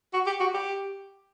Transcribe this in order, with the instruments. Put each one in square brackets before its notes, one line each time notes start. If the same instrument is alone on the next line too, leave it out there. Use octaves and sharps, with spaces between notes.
[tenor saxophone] F#4
G4
F#4
G4